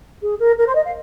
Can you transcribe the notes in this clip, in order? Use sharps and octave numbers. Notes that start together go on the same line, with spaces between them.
G#4
A#4
A#4
C5
D#5
F5